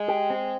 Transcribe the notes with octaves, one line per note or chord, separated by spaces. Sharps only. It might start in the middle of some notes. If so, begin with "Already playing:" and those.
Already playing: G#3
G4
C4